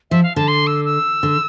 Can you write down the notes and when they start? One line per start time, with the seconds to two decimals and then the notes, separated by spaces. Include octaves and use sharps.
0.11 F3 E5
0.23 F5
0.36 D3 A5
0.48 C6
0.67 E6
0.85 E6
1.23 D3